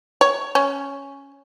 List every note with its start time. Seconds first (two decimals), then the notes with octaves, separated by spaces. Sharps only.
0.21 C#5
0.55 C#4